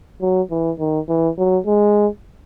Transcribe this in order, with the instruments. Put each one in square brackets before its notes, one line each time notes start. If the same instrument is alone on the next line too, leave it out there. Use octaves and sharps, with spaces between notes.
[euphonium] F#3
E3
D#3
E3
F#3
G#3